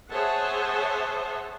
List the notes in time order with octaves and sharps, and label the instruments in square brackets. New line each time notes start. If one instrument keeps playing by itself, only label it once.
[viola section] G#4 C5 C#5 E5 F#5 A5